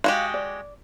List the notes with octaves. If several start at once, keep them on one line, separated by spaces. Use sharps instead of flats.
G#3 F#4 G4 F5
D5